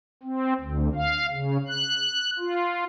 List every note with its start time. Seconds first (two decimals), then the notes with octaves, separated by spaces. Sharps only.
0.23 C4
0.60 D2
0.95 F5
1.31 C#3
1.68 F#6
2.39 F4